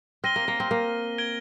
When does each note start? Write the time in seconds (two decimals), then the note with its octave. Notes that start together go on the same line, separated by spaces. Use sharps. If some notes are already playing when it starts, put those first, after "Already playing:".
0.24 C4 F6 A#6 D#7 G7
0.36 A#3
0.48 A#3
0.60 C4
0.71 A#3
1.18 G#6 D7 G7